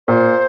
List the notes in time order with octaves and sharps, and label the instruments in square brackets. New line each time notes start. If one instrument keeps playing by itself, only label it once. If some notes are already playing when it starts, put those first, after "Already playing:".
[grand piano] A#2 [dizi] C5